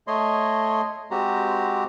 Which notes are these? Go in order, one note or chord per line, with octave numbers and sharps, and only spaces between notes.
A3 C#5 D#5 C6
G#3 C4 F#4 G4 A#5